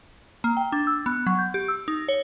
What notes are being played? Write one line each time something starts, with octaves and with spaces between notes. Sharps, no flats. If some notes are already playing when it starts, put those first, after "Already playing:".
A#3
G5
D4
E6
B3
F#3
G6
G4
E6
D#4
C#5